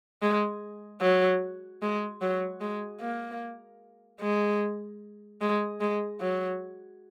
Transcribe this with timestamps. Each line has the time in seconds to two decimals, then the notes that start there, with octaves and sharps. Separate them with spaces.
0.22 G#3
1.02 F#3
1.82 G#3
2.21 F#3
2.61 G#3
3.01 A#3
4.21 G#3
5.41 G#3
5.81 G#3
6.21 F#3